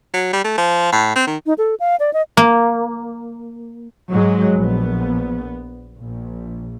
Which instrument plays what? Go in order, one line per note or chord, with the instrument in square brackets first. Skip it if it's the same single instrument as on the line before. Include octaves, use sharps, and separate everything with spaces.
[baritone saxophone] F#3
G3
A3
F3
A2
C4
D#3
[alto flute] D#4
A4
F5
D5
D#5
[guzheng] A#3
[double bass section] G#2 F#3 G#3
A#1 B3
A#1